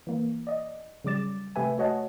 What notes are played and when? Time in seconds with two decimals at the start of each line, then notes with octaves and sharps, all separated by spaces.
0.07 E3 A#3
0.47 D5 D#5
1.04 C#3 F#3 G3 D6 A6 E7
1.56 C3 A3 G4 B4 E5 G#5
1.78 A3 F#4 C#5 D#5 F#5 A5